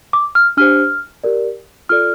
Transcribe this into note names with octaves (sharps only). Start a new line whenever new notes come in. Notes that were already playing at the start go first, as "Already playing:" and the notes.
D6
F6
D4 G4 C5 F6
G4 A#4 D5
F4 A4 D5 F6